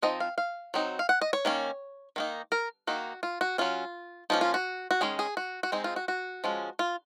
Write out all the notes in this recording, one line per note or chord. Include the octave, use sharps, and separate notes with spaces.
F3 C4 D#4 D#5
F5
F5
F#3 C4 D#4
F5
F#5
D#5
C#5
D#3 A#3 C#4
D#3 A#3 D#4
A#4
D#3 A#3 D#4 F#4
F4
F#4
F#3 C#4 F4
F3 A#3 C#4 D#4
F4
F#4
F#4
D#3 G#3 C#4 G#4
G#4
F#4
F#4
G#3 C4 D#4 G#4
F4
F#4
F#4
F3 G#3 C#4
F4